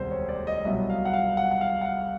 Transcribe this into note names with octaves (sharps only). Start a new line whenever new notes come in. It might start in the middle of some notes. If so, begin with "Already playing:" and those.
Already playing: E1 D2 C3 D#3 G3 C5
C#5
D5
D#5
C2 B2 F#3 E5
F5
F#5
F5
F#5
F#5
F5
F#5
F5